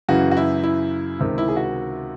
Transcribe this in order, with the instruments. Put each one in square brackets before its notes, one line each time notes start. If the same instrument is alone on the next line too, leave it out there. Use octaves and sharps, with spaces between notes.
[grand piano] F#2 C#3 E3 F#4
F#4
E4
E4
C#2 C3 D#3
E4
G#4
F#4